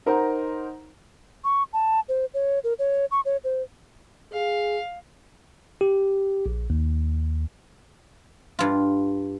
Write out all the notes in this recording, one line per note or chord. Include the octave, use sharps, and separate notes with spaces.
D#4 A#4 C5 F#5 A#5
C#6
A5
C5
C#5
A#4
C#5
C#6
C#5
C5
G#4 F5
G4
A#1
D#2
G2 F4